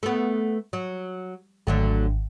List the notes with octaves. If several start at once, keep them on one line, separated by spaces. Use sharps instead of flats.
A3 B3
F#3
G#1 D3 F#3 A3